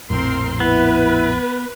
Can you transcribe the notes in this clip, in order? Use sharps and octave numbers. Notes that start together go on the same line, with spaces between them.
A#1 F2 A2 C4 A#4 C6
B3 E4 B4